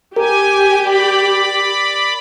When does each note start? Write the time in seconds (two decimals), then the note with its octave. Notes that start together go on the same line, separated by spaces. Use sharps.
0.16 G4 A#4 G#5
0.84 D5 B5